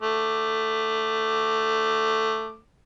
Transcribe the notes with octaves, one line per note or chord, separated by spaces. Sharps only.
A3 D6